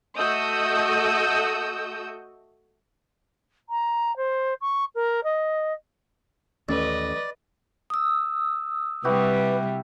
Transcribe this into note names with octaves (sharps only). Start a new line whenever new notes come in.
A3 F#4 D#5 D#6 E6 G6
A#5
C5
C#6
A#4
D#5
A1 D#2 C#4 B4 D5 D#5
D#6 E6
C3 G3 E4 F#4 G4 B4